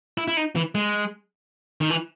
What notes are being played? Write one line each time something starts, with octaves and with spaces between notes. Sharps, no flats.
E4
E4
D#4
E3
G#3
D#3
E3